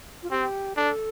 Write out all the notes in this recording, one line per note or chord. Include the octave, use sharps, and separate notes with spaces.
F4
C4 G4
D4 A4